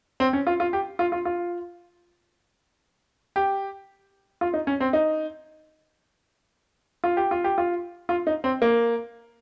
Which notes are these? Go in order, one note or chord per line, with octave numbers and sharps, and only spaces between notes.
C4
C#4
F4
F4
G4
F4
F4
F4
G4
F4
D#4
C#4
C4
D#4
F4
G4
F4
G4
F4
F4
D#4
C4
A#3